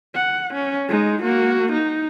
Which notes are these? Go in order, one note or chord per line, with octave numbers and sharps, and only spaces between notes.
F#5
C#4
G#3 D#4
A#3 F#4
D#4